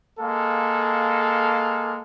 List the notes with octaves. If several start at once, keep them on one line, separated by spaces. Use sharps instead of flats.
G#3 A#3 A4 F5